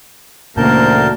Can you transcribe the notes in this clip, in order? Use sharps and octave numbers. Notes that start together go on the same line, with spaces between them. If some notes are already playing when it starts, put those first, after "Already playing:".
D2 A#2 C#3 E3 A#3 A#4 A5 G6